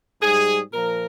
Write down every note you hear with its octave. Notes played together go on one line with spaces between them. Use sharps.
G#2 G3 G#4
A#2 F3 A#4